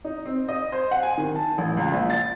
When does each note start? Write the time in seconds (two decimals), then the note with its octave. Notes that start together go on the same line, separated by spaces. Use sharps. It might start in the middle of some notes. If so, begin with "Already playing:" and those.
0.04 D#4
0.26 C4
0.48 D#5
0.72 C5
0.91 F#5
1.03 G#5
1.18 D#3
1.36 A5
1.58 A1
1.77 C#2
1.92 A#1
2.10 A6